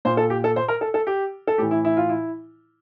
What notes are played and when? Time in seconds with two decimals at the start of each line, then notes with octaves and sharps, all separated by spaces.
0.05 A#2 C5
0.17 A4
0.30 G4
0.44 A4
0.56 C5
0.68 A#4
0.81 A4
0.94 A4
1.07 G4
1.47 A4
1.58 A2 E3 G4
1.71 E4
1.85 E4
1.97 F4
2.09 E4